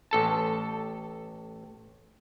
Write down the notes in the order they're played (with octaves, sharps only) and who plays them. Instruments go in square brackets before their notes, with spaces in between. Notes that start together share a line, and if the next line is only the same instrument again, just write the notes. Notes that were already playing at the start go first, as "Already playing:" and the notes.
[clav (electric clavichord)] A1 A4 A5